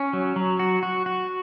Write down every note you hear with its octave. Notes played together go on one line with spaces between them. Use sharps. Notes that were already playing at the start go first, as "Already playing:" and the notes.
Already playing: C#4
F#3
F#3
F#4
F#4
F#4